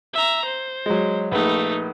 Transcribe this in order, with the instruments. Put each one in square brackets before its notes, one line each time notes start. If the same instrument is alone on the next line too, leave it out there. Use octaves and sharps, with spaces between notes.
[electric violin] E5 A#5
C5
[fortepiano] F#3 G#3
[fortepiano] A#1 B4 [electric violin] A3 D#4